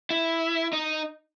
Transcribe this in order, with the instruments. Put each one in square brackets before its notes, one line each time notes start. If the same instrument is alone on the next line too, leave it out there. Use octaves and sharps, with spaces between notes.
[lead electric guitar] E4
D#4